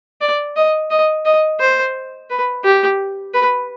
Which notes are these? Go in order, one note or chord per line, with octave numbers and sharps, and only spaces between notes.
D5
D#5
D#5
D#5
C5
B4
G4
B4